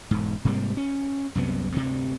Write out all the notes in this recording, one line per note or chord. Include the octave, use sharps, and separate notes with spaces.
E1 G#2
G#2 C3 G3 A#3
C#4
C2 F#2 C3 B3
D2 G2 C3